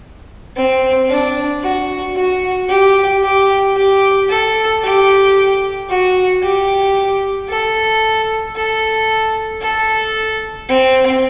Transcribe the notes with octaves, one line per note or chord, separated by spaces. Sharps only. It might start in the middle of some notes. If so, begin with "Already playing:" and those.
C4
D4
F#4
F#4
G4
G4
G4
A4
G4
F#4
G4
A4
A4
A4
C4